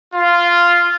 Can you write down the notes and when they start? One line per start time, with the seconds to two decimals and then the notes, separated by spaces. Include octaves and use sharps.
0.14 F4